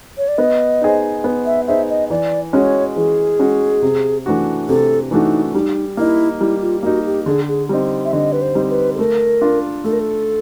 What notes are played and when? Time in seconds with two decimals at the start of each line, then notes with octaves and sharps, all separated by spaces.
0.18 C#5
0.28 D5
0.38 B3 D#5
0.81 D#4 G#4 C5
1.24 B3
1.46 E5
1.67 D#4 G#4 C5 E5
1.89 D#5
2.10 E3 D5
2.53 G#3 C#4 F#4 C#5
2.96 E3 G#4
3.39 G#3 C#4 F#4
3.82 C3
4.26 E3 A3 D4 F#4
4.69 C3 A4
5.11 E3 A3 D4 D#4 F#4
5.54 G3 D#4
5.97 A#3 D#4 E4
6.40 G3 E4
6.61 F4
6.83 A#3 D#4 F#4
7.05 G4
7.26 D3 G#4
7.48 G#4
7.69 G3 C4 D#4
8.05 E5
8.13 D3 D#5
8.33 B4
8.42 C5
8.55 G3 C4 D#4
8.70 B4
8.95 A4
8.99 A3 A#4
9.41 D4 F4
9.84 A3 A4
9.93 A#4
10.00 A4